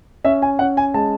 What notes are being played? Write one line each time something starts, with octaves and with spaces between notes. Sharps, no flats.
C#4 E5
G#5
C#4 F#5
G#5
G#3 A5